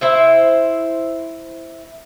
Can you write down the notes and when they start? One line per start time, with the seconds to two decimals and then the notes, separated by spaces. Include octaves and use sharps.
0.01 E4 C5 E5